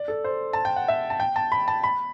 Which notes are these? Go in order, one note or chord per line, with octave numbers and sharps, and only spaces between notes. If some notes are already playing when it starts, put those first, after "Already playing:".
Already playing: D5
A4
C5
A5
G5
F#5
E5
A5
G5
A5
B5
A5
B5